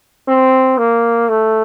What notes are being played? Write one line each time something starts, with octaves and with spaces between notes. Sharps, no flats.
C4
A#3
A3